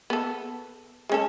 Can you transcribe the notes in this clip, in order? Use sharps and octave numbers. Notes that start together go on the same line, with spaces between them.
B3 A4
G#3 C#4 A4